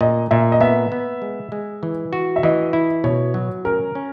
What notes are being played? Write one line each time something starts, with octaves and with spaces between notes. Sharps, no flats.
A#2 D#5
A#2 E5
D#5
B3 E5
B3
G#3
G#3
E3
F#4
E5
E3 D#5
E4
B2 C#5
F#3
C#4 A#4
C#4